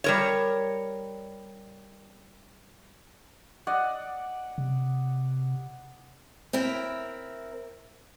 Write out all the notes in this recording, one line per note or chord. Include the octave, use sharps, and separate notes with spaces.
G3 A#4 C#5
D5 D#5 F#5
C3
C4 E4 A#4